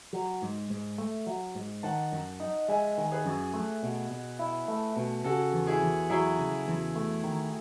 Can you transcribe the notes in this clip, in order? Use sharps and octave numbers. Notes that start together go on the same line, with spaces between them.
F#3
G#2
G#2
A3
F#3
G#2
D#3 F#5 A5
F#2
D#4
G#3 E5 G#5
D#3
G#4 B4
F#2
A3
B2
B2
E4
A3
B2
C#3 F#4 A4
E2
E4 G#4
E2
F#3 E4 G#4
C#3
E2
A3
D#3